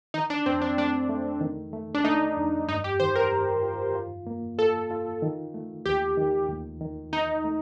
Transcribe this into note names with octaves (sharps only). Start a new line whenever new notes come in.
D#3 D#4
D4
F2 C4
D4
A3 D4
A3
D#3
A3
D4
A3 D#4
F2
G2 D#4
G4
D#3 C5
A#4
G2
F4
F4
A#3
F4 A4
F4
D#3
A3
D#2 G4
D#3
D#2
D#3
D#3 D#4
A3